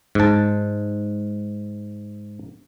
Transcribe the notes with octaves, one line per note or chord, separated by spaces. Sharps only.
G#2 A5